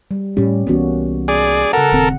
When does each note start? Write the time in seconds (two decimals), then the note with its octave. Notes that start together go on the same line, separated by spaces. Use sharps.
0.11 G3
0.37 A2 G3 C#4 G4
0.67 C2 E3 A#3 B3 C#4 F#4
1.28 G#4 D5
1.73 C#3 A4 A#4 F#5
1.93 D#1 D#2 C4